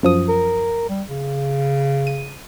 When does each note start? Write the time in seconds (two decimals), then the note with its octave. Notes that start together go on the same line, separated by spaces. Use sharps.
0.03 F#2 F3 D#6
0.29 A#4
0.89 G3
1.08 C#3
2.07 D#7